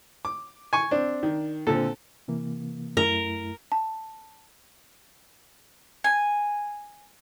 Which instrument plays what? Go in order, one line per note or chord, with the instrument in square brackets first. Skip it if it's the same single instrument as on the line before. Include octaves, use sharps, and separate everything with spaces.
[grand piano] D6
[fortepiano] G#5 C#6
[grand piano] C4 C5 [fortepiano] D4
[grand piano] D#3
[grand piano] A#2 D3 C4 [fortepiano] A4
[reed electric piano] C3 E3 A#3
[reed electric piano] F#2 A3 E4 [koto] A#4
[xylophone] A5
[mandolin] G#5